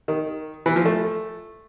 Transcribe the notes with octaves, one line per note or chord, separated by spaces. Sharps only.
D#3
E3
F3
A3